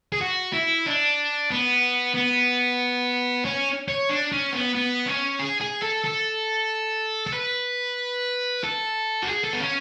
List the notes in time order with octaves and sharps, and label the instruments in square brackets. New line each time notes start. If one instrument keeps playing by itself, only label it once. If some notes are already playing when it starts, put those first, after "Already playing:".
[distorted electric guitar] G#4
F#4
E4
D4
B3
B3
C#4
C#5
D4
C#4
B3
B3
C#4
G#4
G#4
A4
A4
A4
B4
A4
F#4
G#4
A4
B3
C#4